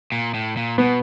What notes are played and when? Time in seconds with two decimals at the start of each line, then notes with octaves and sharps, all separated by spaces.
0.12 A#2
0.34 A2
0.57 A#2
0.78 B2 B3